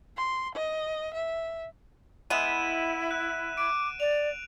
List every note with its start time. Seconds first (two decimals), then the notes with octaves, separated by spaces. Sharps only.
0.17 C6
0.55 D#5
1.14 E5
2.30 G#3 B3 E4 D#7 E7
3.11 F#6
3.58 D6 D7
4.00 D5 F7